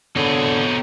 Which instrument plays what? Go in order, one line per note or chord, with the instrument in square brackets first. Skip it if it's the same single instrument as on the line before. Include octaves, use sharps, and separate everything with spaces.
[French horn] D3 [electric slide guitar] B3 A4 C#5 [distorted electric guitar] C4 G#4